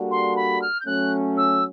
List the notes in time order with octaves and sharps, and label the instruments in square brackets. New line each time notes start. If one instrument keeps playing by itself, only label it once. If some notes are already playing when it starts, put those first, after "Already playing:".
Already playing: [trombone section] G3 A#3 D4 F#4 A4
[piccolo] C6
B5
F6
G6
[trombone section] F#3 A3 C#4 [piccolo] F#6
[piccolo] E6